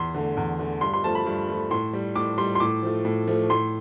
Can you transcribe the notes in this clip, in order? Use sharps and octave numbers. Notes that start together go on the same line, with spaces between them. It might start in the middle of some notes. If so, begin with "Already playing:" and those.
Already playing: E2 C6
D3 A3
E2
D3 A3
G2 C6
C6
F3 A3 A5
B5
G2
F3 A3
A2 C6
G3
A2 D6
G3 C6
C6
A2 D6
F3 A3
A2
F3 A3
A2 C6